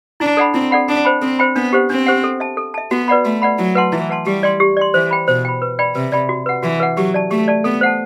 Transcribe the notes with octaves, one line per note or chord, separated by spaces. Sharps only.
D4 E4
A4 D5 F#5 B5
C4 E4
A4 D5 F#5 B5
D4 A4
C5 G5 B5
C4 A4
C5 G5 B5
B3 D4
G4 C5 F#5
C4 D4
G4 C5 F#5
A4
E5 A5
A4
E5 A5
B3 F#4
B4 D5 F#5 B5
A3 F#4
B4 D5 F#5 B5
F#3 E4
B4 F#5 A5 C6
E3 E4
B4 F#5 A5 C6
G3 G4
D5 G5 C6
G4
D5 G5 C6
E3 C5
G5 B5
B2 C5
G5 B5
B4
D5 G5 B5
C3 B4
D5 G5 B5
F#4
B4 F#5
E3 F#4
B4 F#5
F#3 G4
D5 A5
A3 G4
D5 A5
B3 A4
C5 F#5 A5